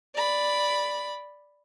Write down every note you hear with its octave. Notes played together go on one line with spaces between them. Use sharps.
D5 B5